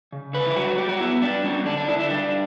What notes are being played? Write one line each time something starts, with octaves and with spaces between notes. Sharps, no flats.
C#3
D3 B4
E4
G3 F#4
G3 G4
F#4
B3 E4
G3 D4
G3 C#4
D3 D4
D4
D3 E4
E4
G3 D4